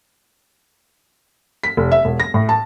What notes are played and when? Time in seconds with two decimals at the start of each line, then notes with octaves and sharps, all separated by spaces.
1.64 B6
1.77 F1
1.92 E5
2.05 E1
2.20 A#6
2.34 A2
2.49 A5